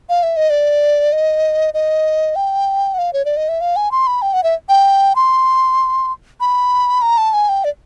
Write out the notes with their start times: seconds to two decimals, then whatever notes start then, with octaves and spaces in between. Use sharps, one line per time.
0.09 F5
0.23 E5
0.37 D#5
0.50 D5
1.12 D#5
1.74 D#5
2.36 G5
2.94 F#5
2.98 F5
3.13 C#5
3.25 D5
3.37 D#5
3.49 E5
3.61 F5
3.76 G#5
3.91 C6
4.07 B5
4.22 G5
4.33 F#5
4.43 E5
4.69 G5
5.16 C6
6.40 B5
7.02 A#5
7.18 A5
7.33 G#5
7.49 G5
7.64 D5